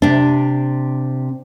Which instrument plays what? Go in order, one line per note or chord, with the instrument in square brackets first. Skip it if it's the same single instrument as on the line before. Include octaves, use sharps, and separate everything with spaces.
[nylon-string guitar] C3 D4